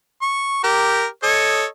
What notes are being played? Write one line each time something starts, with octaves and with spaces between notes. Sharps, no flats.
C#6
G4 A#4
A4 C#5 D#5